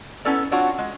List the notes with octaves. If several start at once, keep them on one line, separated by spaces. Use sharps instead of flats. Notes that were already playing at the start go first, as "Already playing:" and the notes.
B3 C#4 E4 A4 D5 A#5
C4 D4 F4 F#4 C#5 F#5
G#3